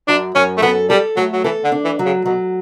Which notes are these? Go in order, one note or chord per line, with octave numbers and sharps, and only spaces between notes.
F#2 D4
F#2 C#4
A3
B3 A4
G3 A4
F#3 A3
F#3
E3 A4
D3
D4
E3
F#3
C#3
B2 F#3